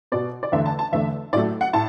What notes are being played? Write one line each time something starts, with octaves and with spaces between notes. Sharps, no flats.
B2 B3 D5
D5
E2 D3 A3 E5
A5
A5
E2 D3 A3 E5
A2 F#3 A3 D5
F#5
A2 A5